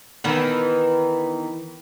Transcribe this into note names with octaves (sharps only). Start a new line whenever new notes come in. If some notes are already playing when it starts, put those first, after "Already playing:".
D#3 E3 B3